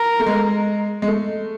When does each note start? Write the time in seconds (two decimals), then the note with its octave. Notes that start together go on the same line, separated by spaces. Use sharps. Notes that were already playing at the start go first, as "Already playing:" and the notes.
Already playing: A#4
0.20 A3
0.27 G#3
1.02 G#3
1.08 A3